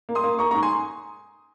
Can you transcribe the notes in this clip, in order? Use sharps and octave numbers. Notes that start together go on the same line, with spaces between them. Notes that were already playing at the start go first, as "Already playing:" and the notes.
A#3
C6 D#6
A#3
A#3 A#5 C#6
A#5 C#6
G#2
G#5 C6